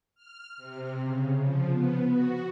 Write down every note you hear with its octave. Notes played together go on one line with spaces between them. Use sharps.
F6
C3
C#3
F3
B3
F#4